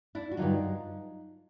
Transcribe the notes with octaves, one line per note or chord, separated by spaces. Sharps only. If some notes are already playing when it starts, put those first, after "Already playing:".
D4 E4
F#4
G2 D3 F#3 D#4 F4